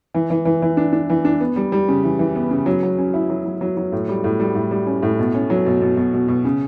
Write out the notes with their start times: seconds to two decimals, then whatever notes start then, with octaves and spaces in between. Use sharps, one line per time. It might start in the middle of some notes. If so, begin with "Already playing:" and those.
0.14 E3
0.30 E3
0.45 E3
0.62 E3
0.77 D4
0.93 D4
1.10 E3
1.25 D4
1.40 B3
1.56 G3
1.72 G3
1.88 C#3
2.04 E3
2.19 E3
2.36 B3
2.51 C#3
2.66 F#3
2.83 F#3
2.98 C#4
3.14 E4
3.30 F#3
3.46 F#3
3.61 F#3
3.77 F#3
3.92 A2
4.08 G3
4.24 A2
4.40 G3
4.55 A2
4.71 G3
4.87 C#4
5.03 A2
5.19 B2
5.35 C#4
5.50 F#3
5.66 B2
5.81 B2
5.97 B2
6.14 B2
6.28 B2
6.45 C#3